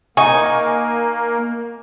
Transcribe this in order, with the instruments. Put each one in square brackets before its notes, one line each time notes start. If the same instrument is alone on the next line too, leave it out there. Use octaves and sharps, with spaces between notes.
[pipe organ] A#3 [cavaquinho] D#4 D#5 C#6 [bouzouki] G#5